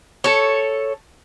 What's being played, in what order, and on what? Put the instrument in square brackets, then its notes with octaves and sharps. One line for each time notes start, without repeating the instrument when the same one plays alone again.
[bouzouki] A4 C#5